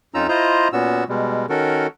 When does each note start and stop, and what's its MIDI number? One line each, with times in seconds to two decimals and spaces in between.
0.14 0.27 41
0.14 0.27 61
0.14 0.27 63
0.14 0.27 65
0.14 0.27 82
0.14 0.27 88
0.29 0.68 64
0.29 0.68 65
0.29 0.68 72
0.29 0.68 75
0.29 0.68 82
0.73 1.04 46
0.73 1.04 59
0.73 1.04 61
0.73 1.04 66
0.73 1.04 88
1.09 1.46 47
1.09 1.46 55
1.09 1.46 56
1.49 1.87 51
1.49 1.87 61
1.49 1.87 66
1.49 1.87 69
1.49 1.87 70